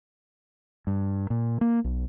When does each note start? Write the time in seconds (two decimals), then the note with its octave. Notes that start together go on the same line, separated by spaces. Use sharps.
0.87 G2
1.30 A#2
1.61 A#3
1.84 B1